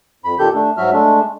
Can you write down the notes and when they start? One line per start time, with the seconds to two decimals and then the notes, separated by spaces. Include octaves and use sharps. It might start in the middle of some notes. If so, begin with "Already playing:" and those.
0.24 F2 B5
0.39 A#2 D#3 G4 A4 G6
0.54 A3 D4
0.77 G#2 F#3 F#4 E5 F6
0.93 G#3 A3 D4